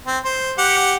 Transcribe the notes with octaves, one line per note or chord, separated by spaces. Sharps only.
C4
C5
G4 F#5